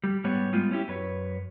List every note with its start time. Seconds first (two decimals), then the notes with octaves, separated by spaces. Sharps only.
0.04 G3
0.24 G#2 G3 B3 C#5
0.53 G3 G#3 B3 F4
0.71 C#4 E4 G4
0.88 F#2 B4 C#5